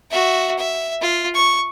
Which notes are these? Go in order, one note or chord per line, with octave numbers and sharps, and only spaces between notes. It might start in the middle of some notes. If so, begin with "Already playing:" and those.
F#4 E5
E5
F4
C#6